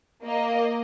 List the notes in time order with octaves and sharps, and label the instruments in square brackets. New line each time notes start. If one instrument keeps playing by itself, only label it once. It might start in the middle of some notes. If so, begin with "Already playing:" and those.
[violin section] A#3 D#5